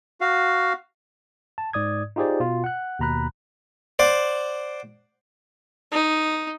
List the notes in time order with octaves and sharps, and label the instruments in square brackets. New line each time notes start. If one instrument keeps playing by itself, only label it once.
[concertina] F#4 F5
[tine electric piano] A5
G#2 D5 D#6 G#6
D#4 F4 G4 G#4 C5 D5
B2 F4
F#5 F#6
D#2 B2 A#5 B5 F#6
[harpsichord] C5 D5 F#5
[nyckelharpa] D#4